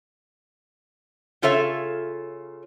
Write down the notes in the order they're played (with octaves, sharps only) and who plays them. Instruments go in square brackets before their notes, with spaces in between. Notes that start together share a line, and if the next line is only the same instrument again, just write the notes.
[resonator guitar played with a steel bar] C#3 F4 A4 C#5 E5